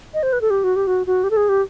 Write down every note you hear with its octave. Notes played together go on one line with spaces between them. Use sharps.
D#5
C5
B4
A4
G4
F#4
G4
F#4
F#4
G4
A4
G#4
G4